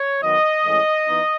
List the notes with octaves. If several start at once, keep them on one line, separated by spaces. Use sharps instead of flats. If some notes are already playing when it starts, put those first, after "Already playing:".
Already playing: C#5
D#3 F#3 B3 D#5
A2 E3 G#3 C#4
E3 B3 D#4